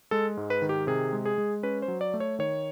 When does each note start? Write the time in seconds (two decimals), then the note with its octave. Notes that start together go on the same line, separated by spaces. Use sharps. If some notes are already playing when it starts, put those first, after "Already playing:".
0.11 G#3 A4
0.37 G#2
0.50 B4
0.62 D#3
0.69 G4
0.87 C3 G#4
1.13 G#3
1.26 G#4
1.38 G#3
1.63 C#4 B4
1.82 C5
1.88 F#3
2.01 D5
2.14 A3
2.20 C#5
2.39 D#3 C#5